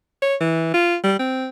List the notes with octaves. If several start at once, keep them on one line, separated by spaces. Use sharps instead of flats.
C#5
E3
F4
G3
C4